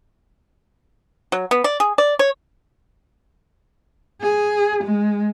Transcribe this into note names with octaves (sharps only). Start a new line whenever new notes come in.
F#3
B3
D5
G#4
D5
C#5
G#4
G#3